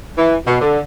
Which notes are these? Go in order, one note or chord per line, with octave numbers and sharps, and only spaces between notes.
E3
B2
D3